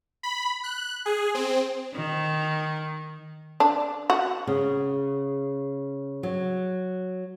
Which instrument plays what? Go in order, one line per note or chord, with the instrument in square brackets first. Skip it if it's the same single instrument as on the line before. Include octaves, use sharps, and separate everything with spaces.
[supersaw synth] B5
F#6
G#4
C4
[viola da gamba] D#3
[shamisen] D4
F#4
[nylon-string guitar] C#3
F#3